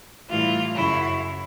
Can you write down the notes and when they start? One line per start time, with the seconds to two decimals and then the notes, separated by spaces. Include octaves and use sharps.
0.29 A2 E3 G3 F4
0.74 F#2 C#3 F#3 E4